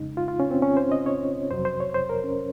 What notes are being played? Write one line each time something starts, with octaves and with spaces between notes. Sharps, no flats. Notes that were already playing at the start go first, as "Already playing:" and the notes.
Already playing: F2 C#3 G#3 D#4
F4
F4
C#4
C4
C#4
C5
D#5
C#5
F2 C3 F#3 C5
C5
C#5
C5
A#4
C#4